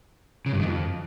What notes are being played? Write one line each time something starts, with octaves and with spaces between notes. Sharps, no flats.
C#3
G2
D#3
F2